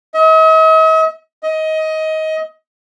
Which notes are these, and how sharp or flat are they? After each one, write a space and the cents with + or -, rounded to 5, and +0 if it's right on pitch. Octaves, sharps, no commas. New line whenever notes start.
D#5 +45
D#5 +20